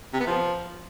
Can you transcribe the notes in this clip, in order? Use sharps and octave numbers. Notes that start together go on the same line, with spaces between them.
C3
B3
F3